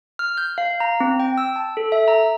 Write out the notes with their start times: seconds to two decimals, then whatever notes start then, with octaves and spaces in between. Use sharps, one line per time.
0.19 F6
0.37 G6
0.58 F5
0.80 A#5
1.00 C4
1.20 G5
1.38 E6
1.56 A5
1.77 A4
1.92 E5
2.08 A#5